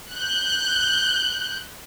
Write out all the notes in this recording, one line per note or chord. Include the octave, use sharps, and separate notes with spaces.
F#6 G6